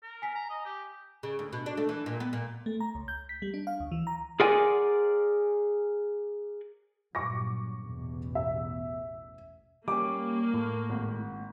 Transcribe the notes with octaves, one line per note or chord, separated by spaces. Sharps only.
A#4
G#5 B6
A#5
D#5
G4
C#3
D2
B2
D4
A3
E3
A#2
B3
A#2
A3
A#5
C#2
G6
B6
G3
D4
F5
D2
E3
A#5
G#4 A#4 C5 D5 F#5 G#5
G2 A#2 F#3 C#6 D6 A#6
A1 E2 B2
E5
G3 A#3 C#4 D6
A2
G#1